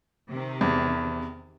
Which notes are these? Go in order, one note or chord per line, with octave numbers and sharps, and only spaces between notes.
C3 D#3
E2